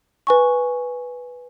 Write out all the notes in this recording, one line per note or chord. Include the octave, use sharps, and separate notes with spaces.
B4 G#5 C#6